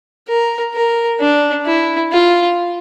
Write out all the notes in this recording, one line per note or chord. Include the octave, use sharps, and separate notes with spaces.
A#4
A#4
D4
E4
F4